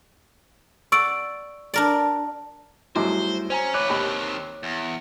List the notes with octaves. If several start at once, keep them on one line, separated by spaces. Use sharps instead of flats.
D5 F#5 C#6 E6 D7
D4 A#4 D5
G#1 F#3 G3 A3 E4 C5 D6
C#4 C5 G#5 A#5
A2 B4 C#5 D6 F#6
D#2 D#3 C4 G4 B5
E2